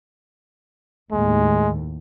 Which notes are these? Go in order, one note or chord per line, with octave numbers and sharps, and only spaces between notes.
D#2 A2 G#3